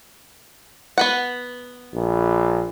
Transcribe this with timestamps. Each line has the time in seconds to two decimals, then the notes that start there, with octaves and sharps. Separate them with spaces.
0.98 B3 B4 F#5
1.94 A#1